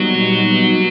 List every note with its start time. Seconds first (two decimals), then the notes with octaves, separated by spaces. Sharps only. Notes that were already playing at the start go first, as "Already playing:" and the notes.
Already playing: A#2 F#3 G3 B3 D#4 F#4
0.28 A#2 G3 B3 D#4 F#4